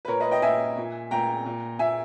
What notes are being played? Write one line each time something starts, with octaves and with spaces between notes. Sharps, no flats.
B4
A#2 A#4 C#5
B4 D#5
D#5 G5
A#2 E5 G#5
A#2
A#2 G5 A#5
A#2
A#2 E5 G#5